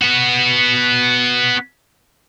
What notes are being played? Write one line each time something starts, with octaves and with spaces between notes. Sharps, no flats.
B3 F#4